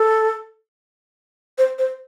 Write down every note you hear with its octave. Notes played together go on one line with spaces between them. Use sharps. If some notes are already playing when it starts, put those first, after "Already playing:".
Already playing: A4
C5
C5